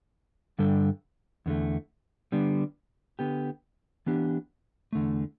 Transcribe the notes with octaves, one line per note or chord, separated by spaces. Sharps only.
G2 D3 G3 D4 A4
E2 D3 A3
D3 G3 B3 D4
D3 B3 G4
E3 B3 D4 G4
E2 D3 A3